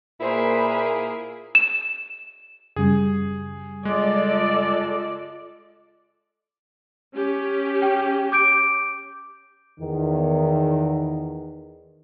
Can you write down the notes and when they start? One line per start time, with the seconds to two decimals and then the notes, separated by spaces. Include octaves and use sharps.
0.21 A#2 A#3 E4 G#4 B4 C5 B5
1.55 E7
2.76 F#2 C#3 G3 G#4
3.85 G#3 F4 A4 D5 D#5
7.14 C#4 G4
7.82 G5
8.32 D6 G6 D7
9.81 E2 D#3